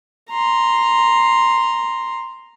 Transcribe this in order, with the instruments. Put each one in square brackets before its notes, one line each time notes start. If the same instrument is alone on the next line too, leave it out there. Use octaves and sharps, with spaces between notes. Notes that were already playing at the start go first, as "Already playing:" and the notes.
[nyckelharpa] A#5 C6